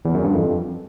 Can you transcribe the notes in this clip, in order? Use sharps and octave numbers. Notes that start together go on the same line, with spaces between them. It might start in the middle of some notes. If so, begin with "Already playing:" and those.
E2
F#2
G2
F2